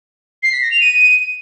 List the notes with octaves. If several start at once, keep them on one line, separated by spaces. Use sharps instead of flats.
C7
B6
A#6
F7
D#7